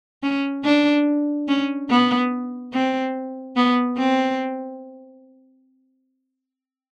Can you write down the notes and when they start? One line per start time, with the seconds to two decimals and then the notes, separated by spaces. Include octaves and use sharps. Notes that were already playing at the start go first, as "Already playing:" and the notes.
0.23 C#4
0.64 D4
1.48 C#4
1.90 B3
2.73 C4
3.56 B3
3.97 C4